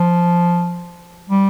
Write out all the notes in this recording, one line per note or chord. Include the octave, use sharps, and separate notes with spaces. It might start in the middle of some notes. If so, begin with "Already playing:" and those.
Already playing: F3
G3